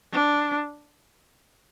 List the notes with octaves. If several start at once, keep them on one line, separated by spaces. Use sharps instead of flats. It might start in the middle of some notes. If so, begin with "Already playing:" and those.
D4